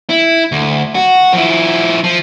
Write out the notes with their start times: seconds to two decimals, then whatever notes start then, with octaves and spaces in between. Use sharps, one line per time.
0.10 E4
0.52 D2
0.95 F#4
1.33 F3 E4
2.04 F3